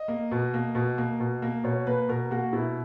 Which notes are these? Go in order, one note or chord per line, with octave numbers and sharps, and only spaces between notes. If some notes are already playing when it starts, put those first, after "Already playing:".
Already playing: D#5
A#3
B2
A#3
B2
A#3
B2
A#3
B2 C#5
A#3 B4
B2 A#4
A#3 F#4
B2 E4